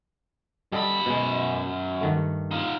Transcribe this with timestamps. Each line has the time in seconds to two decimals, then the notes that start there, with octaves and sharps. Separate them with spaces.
0.72 F#2 G3 A4 D#5 B5
1.06 B2 G#3
2.01 G2 D#3 A3
2.51 D#4 F4